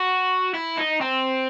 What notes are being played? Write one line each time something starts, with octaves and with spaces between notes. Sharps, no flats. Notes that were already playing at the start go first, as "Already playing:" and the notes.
Already playing: F#4
E4
D#4
C4